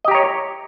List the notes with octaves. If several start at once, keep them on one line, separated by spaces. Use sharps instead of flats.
G4 C#5 D#5 A#5